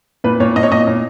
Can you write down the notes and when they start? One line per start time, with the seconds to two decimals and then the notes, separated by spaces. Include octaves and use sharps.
0.24 A#2 B4
0.40 A#2 C#5
0.56 A#2 D#5
0.63 C#5
0.71 A#2 D#5
0.87 A#2